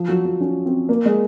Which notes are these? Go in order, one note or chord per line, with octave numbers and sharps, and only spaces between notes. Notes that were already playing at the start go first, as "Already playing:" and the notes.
Already playing: F3
F#3
F#3
C#4
C4
A#3
G#3